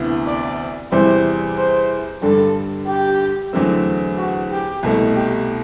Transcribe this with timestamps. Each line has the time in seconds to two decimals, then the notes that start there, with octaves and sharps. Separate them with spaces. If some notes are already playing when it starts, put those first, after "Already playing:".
Already playing: D2 C3 E3 B3 E4
0.26 D5
0.91 E2 C3 G3 C4 E4 C5
1.57 C5
2.22 G2 D3 G3 A4
2.87 G4
3.53 E2 D3 F#3 A3 C4
4.17 F#4
4.51 G4
4.83 C2 B2 A3
5.16 G4